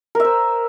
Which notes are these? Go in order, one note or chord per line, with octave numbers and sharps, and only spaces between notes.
A#4 C5 E5